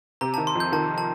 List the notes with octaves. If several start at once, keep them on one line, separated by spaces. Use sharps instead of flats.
C3 A#5
D#3 A5
C6
F2 G6
D#3 A5
A5